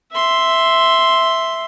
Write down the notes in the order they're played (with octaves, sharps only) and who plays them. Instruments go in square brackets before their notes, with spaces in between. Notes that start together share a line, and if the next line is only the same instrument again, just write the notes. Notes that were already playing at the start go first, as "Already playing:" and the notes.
[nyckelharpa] E5 C6